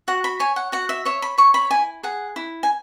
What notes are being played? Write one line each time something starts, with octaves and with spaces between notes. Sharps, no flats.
F#4 F#5
B5
C#5 G#5
F#5
F#4 F#5
E5
C#5 E5
B5
C#5 C#6
B5
E4 G#5
G#4 F#5
E4
G#5